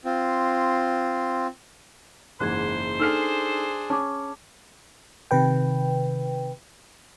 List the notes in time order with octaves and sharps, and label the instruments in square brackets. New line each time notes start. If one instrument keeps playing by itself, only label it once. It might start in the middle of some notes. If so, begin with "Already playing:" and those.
[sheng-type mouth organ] C4 F4
[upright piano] F#1 G#2 E3 [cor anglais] C5 [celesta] F#6 G#6
[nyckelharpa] D4 G#4 [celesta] D#4 A4 [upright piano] E6 F6 C7
[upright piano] C#4 [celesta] A5 D6
[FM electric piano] C3 D#3 B4 G5